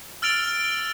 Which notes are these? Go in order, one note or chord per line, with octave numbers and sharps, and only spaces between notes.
E6 F6 A6 D7 F7 G7